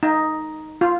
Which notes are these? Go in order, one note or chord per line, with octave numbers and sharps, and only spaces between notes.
D#4
F4